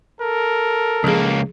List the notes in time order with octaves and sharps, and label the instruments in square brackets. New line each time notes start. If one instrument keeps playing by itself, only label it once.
[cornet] A4 [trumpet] A#4
[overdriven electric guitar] C#2 A#3 [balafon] F3 G#4